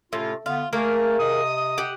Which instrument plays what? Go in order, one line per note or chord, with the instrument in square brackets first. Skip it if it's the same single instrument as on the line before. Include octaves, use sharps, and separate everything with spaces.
[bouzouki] A2 [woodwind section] C3 C#4 F4
[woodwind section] D3 B3 [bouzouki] F4
[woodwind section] A3 [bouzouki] A#3 G#4 A#4
[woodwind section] C3 D#5 D#6
[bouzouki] G4 F#5